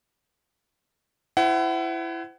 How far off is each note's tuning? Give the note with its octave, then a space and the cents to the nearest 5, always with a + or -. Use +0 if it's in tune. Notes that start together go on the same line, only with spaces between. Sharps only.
E4 +20 C5 -30 F#5 +30